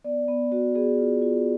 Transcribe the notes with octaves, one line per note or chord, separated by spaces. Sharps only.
B3 D5
B3
B3 F#4
B3 G#4
F4
F4